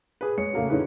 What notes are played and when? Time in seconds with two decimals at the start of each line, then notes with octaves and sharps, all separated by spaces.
0.21 G#4 B4
0.37 G#3 C#5 C#7
0.53 C#3 A3 A#3 F#4
0.69 D3 C#4 D#4 E4 G#4 B4